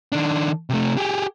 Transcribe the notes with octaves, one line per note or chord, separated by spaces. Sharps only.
D#3 D4
C3 A3
G4 G#4